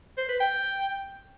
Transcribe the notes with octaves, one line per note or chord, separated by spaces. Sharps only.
C5
B4
G5